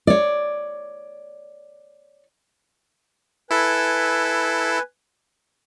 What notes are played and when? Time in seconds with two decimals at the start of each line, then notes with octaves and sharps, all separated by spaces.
0.07 C#5 D5
3.51 E4 A4 B4 G#5